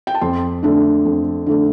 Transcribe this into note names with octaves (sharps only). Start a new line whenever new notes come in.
G5
A5
F2 C6
D3 A3 D4
F2
D3 A3 D4